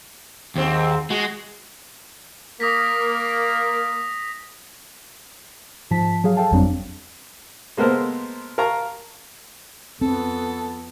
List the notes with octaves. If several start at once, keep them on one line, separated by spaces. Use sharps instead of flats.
D#2 G#2 C4
G#3 F#4
A#3 D#6 A#6 B6
G#2 F3 A5 B6
F#3 G#4 F5
A4 F5 G5 A5
G1 F2 F#3 G3 C4 D4
G#3 A#3 B3 A4 A#4 C5
A#4 F5 A5 A#5 C#6
F2 B3 C4 A4